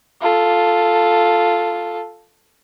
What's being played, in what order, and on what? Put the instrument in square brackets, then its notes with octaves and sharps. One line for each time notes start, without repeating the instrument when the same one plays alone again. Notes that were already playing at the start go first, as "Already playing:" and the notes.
[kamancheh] F4 A4